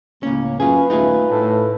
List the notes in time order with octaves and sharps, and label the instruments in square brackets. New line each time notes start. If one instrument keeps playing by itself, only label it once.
[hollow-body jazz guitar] C#2 C#4 [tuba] A2 [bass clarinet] A#3
[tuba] F#2 [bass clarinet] C#4 [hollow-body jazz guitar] F4 G#4 [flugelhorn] B4
[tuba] D#1 [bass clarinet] A3 [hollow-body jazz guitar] D#4 F4 G#4
[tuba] A2 [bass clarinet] A4